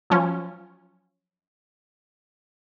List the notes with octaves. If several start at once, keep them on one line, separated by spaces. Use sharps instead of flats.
F3 F#3 C#4 F4